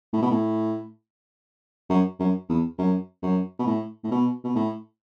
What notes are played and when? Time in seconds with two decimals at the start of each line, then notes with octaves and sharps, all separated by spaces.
0.13 A2
0.22 B2
0.31 A2
1.90 F#2
2.19 F#2
2.49 E2
2.78 F#2
3.23 F#2
3.59 B2
3.66 A2
4.04 A2
4.11 B2
4.44 B2
4.56 A2